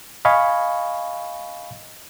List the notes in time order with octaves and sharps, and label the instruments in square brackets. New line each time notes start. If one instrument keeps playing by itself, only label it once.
[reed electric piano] D#5 F5 G#5 B5 C#6